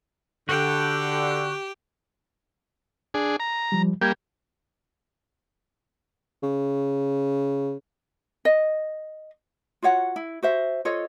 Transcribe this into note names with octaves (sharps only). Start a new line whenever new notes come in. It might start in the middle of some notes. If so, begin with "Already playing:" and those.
D3 F#4 G4 F#5 G5
D4 G#4
A#5
F3 G3
G3 A#3 G6 G#6
C#3
D#5
F4 F#4 C#5 F#5
E4
F#4 C5 E5
F4 A4 C#5 D#5